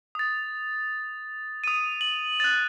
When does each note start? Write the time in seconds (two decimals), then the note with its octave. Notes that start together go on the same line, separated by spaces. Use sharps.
0.15 D#6 A6
1.64 D#6 D#7
2.01 F#7
2.40 F#6 A6